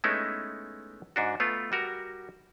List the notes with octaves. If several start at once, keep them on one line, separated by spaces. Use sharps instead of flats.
G#3 A3 B3 C#4 D#4 E4
G#2 D4 F#4
A3 B3 F4
G3 F#4 A#4